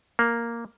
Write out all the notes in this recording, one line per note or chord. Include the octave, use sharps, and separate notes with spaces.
A#3